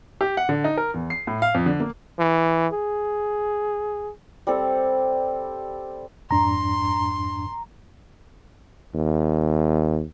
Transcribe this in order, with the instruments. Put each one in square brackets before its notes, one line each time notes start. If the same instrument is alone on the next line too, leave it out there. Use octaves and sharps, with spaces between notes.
[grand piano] G4
F#5
D3
D#4
A#4
E2
C7
A2
F5
F2
D3
A#3
[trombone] E3
G#4
[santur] G3 C4 A4
[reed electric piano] F2 G#2 D4 [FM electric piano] A#5 [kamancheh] C6
[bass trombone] D#2